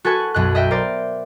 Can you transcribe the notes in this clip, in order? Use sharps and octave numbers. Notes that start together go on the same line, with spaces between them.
F#4 A4 B4 G#5 C#6 F#6
B1 F#2 D#5 F#6
D#5 E5 G5
A#4 C5 D5